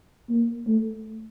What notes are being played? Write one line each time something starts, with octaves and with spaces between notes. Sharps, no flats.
A#3
A3